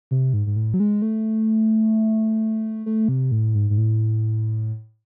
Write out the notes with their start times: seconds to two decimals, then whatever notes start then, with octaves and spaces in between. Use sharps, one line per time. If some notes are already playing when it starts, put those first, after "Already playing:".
0.11 C3
0.34 G#2
0.47 G#2
0.56 A2
0.74 F#3
0.80 G#3
1.02 A3
2.86 A3
3.08 C3
3.32 A2
3.55 G#2
3.70 G#2
3.77 A2